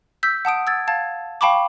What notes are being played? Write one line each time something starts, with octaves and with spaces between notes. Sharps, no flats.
E6 G6 B6
F#5 A5 D#6 D7
E6 G#6 A6
F5 A5 G#6 A6
F5 G5 A5 B5 C#6 D6